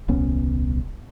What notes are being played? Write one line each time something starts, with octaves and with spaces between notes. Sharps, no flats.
D#1 C2 B3 C#4